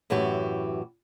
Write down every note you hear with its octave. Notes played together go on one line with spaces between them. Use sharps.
F#2 A2 E3 F#4 G4